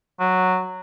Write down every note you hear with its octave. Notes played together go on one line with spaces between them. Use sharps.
F#3